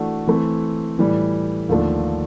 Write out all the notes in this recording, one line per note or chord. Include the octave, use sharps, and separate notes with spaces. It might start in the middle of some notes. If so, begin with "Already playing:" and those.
Already playing: E3 A3 D4 F#4
E3 A3 C4
A2 E3 G3
D#2 D3 F3 A3 D4